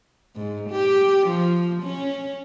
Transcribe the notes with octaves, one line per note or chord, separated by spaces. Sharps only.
G#2
G4
F3
C#4